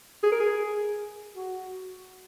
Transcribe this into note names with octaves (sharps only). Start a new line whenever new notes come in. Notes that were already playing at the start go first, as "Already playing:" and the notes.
G#4
A#4
G#4
F#4